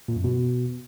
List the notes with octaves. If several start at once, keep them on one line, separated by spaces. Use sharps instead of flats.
A#2
F#2
B2